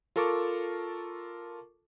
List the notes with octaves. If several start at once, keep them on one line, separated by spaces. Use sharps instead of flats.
F4 A4 A#4 A5 C#6 D6